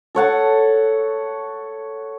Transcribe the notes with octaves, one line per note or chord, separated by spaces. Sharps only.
A4 C#5 F#5 A5